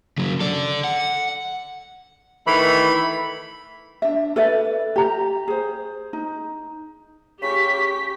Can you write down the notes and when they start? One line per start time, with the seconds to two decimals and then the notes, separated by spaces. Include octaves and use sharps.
0.18 C#3 F#3
0.40 A4 D5
0.84 F#5
2.47 D#3 E3 A3 B5
4.02 D4 E5
4.36 A4 B4 D5 E5
4.96 G4 A#5
5.48 G#4 C5
6.13 D#4
7.42 C#3 G4 C#6 B6